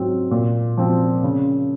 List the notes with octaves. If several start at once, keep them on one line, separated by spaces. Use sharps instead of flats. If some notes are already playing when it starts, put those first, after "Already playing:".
Already playing: G#2 F#3 C4
A#2
F3 C4
C#3